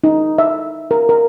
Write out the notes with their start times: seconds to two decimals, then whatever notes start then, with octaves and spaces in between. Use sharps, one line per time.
0.04 D#4
0.38 E5
0.91 A#4
1.09 A#4